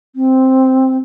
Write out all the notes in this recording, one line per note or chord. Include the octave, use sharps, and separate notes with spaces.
C4